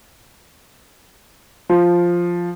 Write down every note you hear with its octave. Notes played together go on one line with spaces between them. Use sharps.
F3